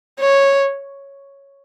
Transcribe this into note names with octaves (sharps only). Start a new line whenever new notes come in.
C#5